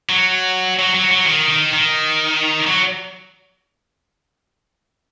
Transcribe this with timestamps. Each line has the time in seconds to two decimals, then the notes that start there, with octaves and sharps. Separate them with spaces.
0.09 F#3
0.79 F#3
0.95 F#3
1.11 F#3
1.26 D#3
1.50 D#3
1.73 D#3
2.67 F#3